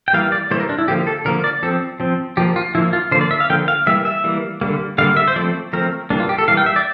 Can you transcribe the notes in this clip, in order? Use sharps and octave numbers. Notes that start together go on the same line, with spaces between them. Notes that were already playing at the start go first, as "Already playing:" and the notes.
G5
E3 G3 A#3 F5
D5
E3 G3 A#3 C5
A#4
D4
E4
D3 F3 A#3 G4
A4
D3 F3 A#3 A#4
D5
F3 C4 A4
F3 C4
F3 A#3 G4
F4
F3 A#3 E4
F4
D3 F3 A#3 C5
D5
E5
F5
D3 F3 A#3 G5
F5
E3 G3 A#3 E5
E5
E3 G3 A#3
D3 G3 A#3
D3 G3 A#3 F5
E5
C5
F3 A3 C4 D5
F3 A3 C4 A#4
E3 G3 A#3 D4
F4
G4
A4
E3 G3 A#3 F5
G5
E5
D5